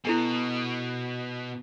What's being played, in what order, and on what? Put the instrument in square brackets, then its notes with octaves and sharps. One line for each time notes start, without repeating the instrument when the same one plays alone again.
[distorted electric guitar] B2 [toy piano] E4 A4 G#5